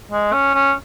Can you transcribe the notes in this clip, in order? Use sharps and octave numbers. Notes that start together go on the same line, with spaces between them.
G#3
C#4
C#4